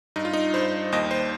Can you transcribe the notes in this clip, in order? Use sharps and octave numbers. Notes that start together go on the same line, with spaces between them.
G2 D#4
F4
D#4
G2 C5
D#2 D#5
C5